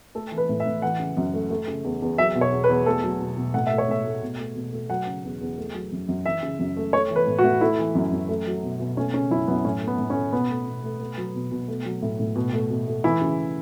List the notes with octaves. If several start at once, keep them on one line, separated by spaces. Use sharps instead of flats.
A3 A4
E3
B4
A2
E5
A2
E3 F#5
C#3
F#2
A3
A3
C#3
E2
E2
F#3 E5
B2
C#5
E2
B4
E2
A3 A4
F#3
B2
B2
A2 F#5
A3 E5
C#5
A2 E5
A3
B2
A3
B2
A3
F#3 F#5
C#3
E2
E2
A3
F#3
F#2
F#2
E3 E5
C#3
F#2
A3
A3 C#5
E3
B4
A2
F#4
A2
A3 E4
E3
F#2
F#2
A3
F#3
B2
B2
A3 C#4
C#3 C#4
F#2 E4
F#2 B3
A2 C#4
A3
B3
A2
C#4
A3
B2 B3
A3
B2
A3
A3
F#3
B2
B2
A3
F#3
A2
A2
B2
A3
B2
A3
E3 E4
C#3